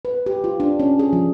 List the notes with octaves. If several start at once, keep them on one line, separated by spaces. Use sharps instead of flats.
B4
G4
F4
D4
C#4
G#4
F3